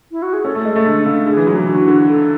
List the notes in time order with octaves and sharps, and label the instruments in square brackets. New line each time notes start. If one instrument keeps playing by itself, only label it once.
[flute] E4
F#4
G#4
[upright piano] C#4 [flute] A4
[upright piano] A3
G#3
A3
D3
C#3
[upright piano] D3 [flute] G#4
[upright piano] E3
F#3
E3
[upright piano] D3 [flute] F#4
[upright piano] D3
[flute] A4